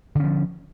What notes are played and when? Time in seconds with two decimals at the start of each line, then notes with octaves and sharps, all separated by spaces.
0.15 D3
0.20 C#4
0.24 F3